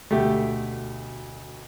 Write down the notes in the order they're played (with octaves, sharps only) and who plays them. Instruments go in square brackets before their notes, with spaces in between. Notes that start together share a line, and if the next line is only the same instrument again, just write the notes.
[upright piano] D2 B2 [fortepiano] A3 G4